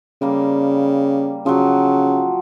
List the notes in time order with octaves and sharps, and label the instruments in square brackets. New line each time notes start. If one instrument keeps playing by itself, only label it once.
[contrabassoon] C#3 [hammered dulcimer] G3 A#3
[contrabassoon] C#3 [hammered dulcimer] F3 F#3